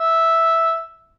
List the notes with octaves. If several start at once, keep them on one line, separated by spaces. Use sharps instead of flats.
E5